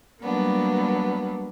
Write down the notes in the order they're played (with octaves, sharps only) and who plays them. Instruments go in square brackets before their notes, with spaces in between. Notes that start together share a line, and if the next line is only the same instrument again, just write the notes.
[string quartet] F#3 G3 A#3 B3 D4